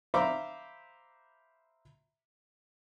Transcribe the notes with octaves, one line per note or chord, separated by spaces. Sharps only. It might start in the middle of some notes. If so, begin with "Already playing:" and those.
C5 E5 F5 A#5 B5 D6